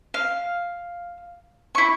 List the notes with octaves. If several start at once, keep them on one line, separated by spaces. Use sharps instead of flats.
F5
E4 C#6